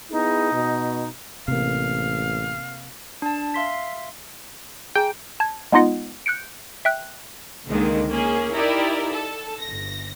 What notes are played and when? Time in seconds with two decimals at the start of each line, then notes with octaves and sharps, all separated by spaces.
0.11 B3 D#4 E4 G#4
0.52 B2
1.48 A1 C3 A#3 F5
3.22 D4 A5
3.54 E5 F5 C6 B6
4.95 G#4 G5 G#5 A#5
5.40 A5 G#6
5.72 G#3 B3 D#4 F4 D#5 F#5
6.26 F#6 G6 C#7 D7
6.85 E5 G5 F#6
7.68 C#2 D3 D#3 G#3 A#3 C4
8.10 A#3 C#4 G#4
8.53 D#4 E4 G4 A#4 D5 E5
9.11 A4
9.59 G1 A#6